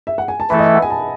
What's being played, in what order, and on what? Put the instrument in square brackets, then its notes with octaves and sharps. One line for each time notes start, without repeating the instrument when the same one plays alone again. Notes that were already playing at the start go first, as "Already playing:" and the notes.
[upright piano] E5
F#5
G#5
A5
[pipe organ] E3 A3 E4 A4 [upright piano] B5
[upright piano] D#5
E5
F#5
G#5
A5